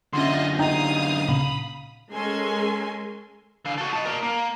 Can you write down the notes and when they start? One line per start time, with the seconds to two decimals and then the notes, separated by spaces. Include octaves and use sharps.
0.13 F#2 D3 C#4 F4 D#5 E5 C6
0.59 D#4 F5 G5 D#6
1.29 A#2 C#3 B5
2.12 G#3 C#4 A4 A#4 G#5 C6
3.66 D3 F5
3.78 F#4 A4
3.93 D#5 A5
4.05 A#4 D5
4.22 A#3